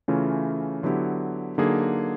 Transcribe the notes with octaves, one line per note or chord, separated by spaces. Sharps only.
C#3 E3 A3 C#4 F4
D3 F#3 B3 E4 G4
D3 F#3 A#3 D#4 G#4